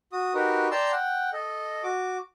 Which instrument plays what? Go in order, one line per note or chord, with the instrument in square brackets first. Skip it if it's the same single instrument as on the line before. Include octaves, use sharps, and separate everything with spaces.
[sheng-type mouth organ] F#4 D#6
D#4 F#4 G4 A#4 B4
D5 G5 A5 A#5 C6 E6
F#5 G5
A4 D#5
F#4 D6